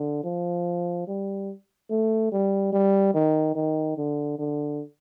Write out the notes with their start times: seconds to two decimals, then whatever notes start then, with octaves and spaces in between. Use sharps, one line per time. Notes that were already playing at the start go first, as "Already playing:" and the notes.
Already playing: D3
0.24 F3
1.08 G3
1.90 A3
2.32 G3
2.73 G3
3.14 D#3
3.55 D#3
3.98 D3
4.39 D3